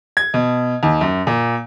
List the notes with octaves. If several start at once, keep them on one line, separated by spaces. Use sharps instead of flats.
G#6
B2
D#2
F#2
A#2